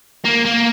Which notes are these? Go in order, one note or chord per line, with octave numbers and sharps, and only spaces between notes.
A#3
A#3